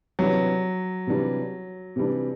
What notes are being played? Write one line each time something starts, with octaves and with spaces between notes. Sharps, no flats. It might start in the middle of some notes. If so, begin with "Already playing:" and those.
C3 E3 F#3 G3 D4
C3 E3 G3 D4
C3 E3 G3 D4